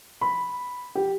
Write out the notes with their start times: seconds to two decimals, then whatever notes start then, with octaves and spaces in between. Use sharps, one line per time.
0.21 B5
0.95 G4